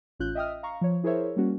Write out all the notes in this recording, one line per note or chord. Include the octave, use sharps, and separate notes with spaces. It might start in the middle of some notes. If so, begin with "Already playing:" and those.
A1 C#4 F4 F#6 G6
D#5 E5 G5 D#6 F6
F5 A#5 C#6
F3 C#5
E4 G#4 A#4 C5 C#5 E5
G3 A#3 C#4 F#4